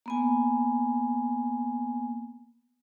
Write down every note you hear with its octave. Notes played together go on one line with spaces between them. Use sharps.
A#3 B3 G#5